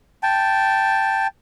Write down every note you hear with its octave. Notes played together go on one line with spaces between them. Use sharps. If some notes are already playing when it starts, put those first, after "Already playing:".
G5 A5